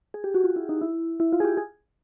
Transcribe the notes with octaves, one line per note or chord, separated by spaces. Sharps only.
G#4
G4
F#4
F4
E4
D#4
E4
E4
F4
G#4
G4
G#4